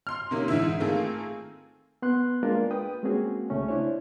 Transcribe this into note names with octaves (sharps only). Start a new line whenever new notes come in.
C6 F6
C3 D#3 A#3 C#4
G#2 D3 E3 E4
D#3 A3 A#3 C4 F4 G#4
B3 C6 F#6
G#3 A#3 D4 F4 A#4
B4 G5 D#6
G#3 A#3 C4 C#4 F#4 G#4
C2 C#3 A3 C#4
D4 E4 C5 C#5